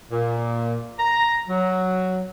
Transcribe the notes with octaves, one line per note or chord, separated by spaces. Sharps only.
A#2
A#5
F#3